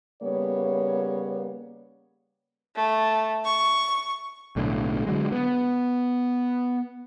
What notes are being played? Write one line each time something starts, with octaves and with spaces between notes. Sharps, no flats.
C#3 G3 A#3 B3 C#5
A3
C#6
B1 A2 D3
D3 F#3 G#3
B3